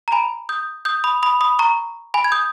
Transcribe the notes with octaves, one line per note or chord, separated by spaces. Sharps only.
A#5
G#5 B5
D#6 G6
D#6 G6
B5 D#6
B5 D#6
B5 D#6
A#5 C#6
G#5 B5
G#6
D#6 G6